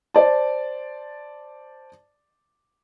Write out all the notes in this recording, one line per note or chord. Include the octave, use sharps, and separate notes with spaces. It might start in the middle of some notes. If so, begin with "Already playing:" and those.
C5 D5 A5